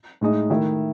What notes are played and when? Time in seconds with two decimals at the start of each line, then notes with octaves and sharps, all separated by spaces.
0.21 A2 G#3 D#4
0.50 D#3 A3 E4